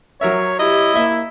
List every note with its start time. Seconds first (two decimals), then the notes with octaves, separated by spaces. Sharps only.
0.21 F#3 A#4 C#5 E5
0.60 E4 G4 D#5
0.96 A#3 E5